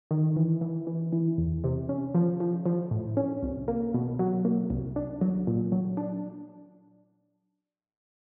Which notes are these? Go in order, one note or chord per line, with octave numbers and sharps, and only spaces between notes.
D#3
E3
E3
E3
E3
E2
C3
C#4
F3
F3
F3
A2
C#4
C2
A#3
B2
F#3
A#3
C2
D4
F#3
A#2
F#3
D4